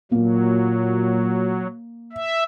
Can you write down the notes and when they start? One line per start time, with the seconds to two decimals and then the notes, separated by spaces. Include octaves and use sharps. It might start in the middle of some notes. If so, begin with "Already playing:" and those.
0.12 A#2 F#3 A#3
2.13 E5